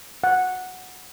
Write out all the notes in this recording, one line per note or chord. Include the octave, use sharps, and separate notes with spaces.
F#5